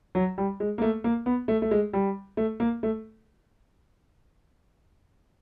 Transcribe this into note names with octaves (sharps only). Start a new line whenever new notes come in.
F#3
G3
G#3
A#3
A3
A#3
B3
A3
A3
G#3
G3
A3
A#3
A3